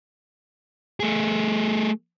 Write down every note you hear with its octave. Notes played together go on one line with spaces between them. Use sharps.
A3 G#4